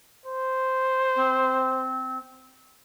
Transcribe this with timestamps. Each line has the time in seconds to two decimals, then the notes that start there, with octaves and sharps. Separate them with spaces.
0.26 C5
1.15 C4